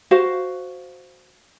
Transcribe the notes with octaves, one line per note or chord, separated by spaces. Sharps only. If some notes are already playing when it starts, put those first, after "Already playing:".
F#4 C5 F5